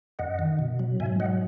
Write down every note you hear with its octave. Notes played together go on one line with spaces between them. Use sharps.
F#2 D#5 F#5
D#3
B2
F#3
G#2 E5 G#5
F#3 D#5 F#5